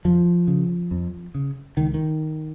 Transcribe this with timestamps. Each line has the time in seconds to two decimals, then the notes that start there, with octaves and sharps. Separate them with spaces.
0.05 F2 F3
0.48 C#3
0.91 F2
1.35 C#3
1.77 C#2 D#3
1.94 D#3